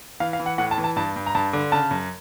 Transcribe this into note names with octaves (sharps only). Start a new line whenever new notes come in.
E3 F5
F5
E3
F#5
A2 F#5
A5
E3
A5
G2 A5
G2
A#5
G2 A5
D3
C#3 A5
F#2